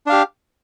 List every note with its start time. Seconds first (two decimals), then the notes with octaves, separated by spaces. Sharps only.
0.07 D4
0.09 F5
0.12 G4